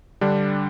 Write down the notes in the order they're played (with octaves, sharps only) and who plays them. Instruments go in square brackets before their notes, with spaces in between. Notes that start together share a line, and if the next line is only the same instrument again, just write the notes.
[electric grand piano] D3 G3 D4